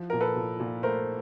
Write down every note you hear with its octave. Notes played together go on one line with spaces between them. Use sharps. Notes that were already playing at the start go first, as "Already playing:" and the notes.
Already playing: F3
A#2 A#4
A4 B4
A#2
A#2
A3 A#4 C5